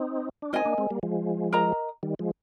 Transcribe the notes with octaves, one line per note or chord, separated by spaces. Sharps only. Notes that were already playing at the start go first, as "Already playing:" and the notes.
Already playing: C4 D#4
D4
C4 D#4 A#4 D#5 G#5
A#3 D4
G#3 C4
G3 A#3
F3 G#3
A#4 D#5 A#5
D#3 G3
F3 G#3